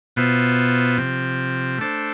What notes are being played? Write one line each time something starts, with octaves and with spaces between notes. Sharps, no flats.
B2 B3 F4 C5 E5
C3 F3 C4
A3 D4 A4 C5